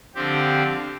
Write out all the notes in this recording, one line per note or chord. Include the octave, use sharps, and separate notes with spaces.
D3 F3 C4 G4